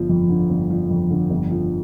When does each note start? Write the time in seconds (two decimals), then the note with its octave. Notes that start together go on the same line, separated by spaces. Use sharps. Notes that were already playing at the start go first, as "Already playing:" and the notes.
Already playing: G1 F3
0.09 F2
0.30 D3
0.50 G1
0.70 F3
0.91 F2
1.10 D3
1.30 G1
1.51 F3